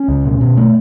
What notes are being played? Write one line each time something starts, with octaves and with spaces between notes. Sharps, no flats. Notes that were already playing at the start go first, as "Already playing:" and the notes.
Already playing: C#4
C#2
B2
B2
A3